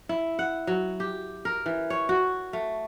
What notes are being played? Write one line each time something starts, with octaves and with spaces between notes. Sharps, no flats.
E4
F#5
F#3
G4
A#4
E3
C#5
F#4
A3